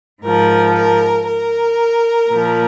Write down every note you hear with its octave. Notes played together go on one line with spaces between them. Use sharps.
G#2 F3 A#4
A#4
A#4
A#2
F3